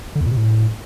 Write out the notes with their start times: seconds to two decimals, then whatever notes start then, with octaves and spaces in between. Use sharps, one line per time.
0.15 D3
0.21 E2
0.26 A#2
0.31 C3
0.37 A2